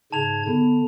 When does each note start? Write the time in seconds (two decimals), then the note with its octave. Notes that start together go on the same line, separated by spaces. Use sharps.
0.12 G#2 C#3 A5 G#6 F7
0.47 D3 B3